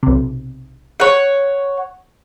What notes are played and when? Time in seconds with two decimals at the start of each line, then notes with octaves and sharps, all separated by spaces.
0.03 B1 C3
1.00 C#5 F#5